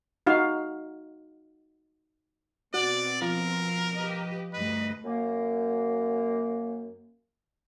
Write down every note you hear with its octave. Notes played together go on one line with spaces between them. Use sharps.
D#4 F#4 F5
B2 C4 F#4 D5
F3 A#4
G4 B4 D#5
D2 G2 B4 D#5
F#2 A#3